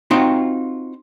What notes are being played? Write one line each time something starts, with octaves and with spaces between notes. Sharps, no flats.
C4 D#4 F4 F#4 G5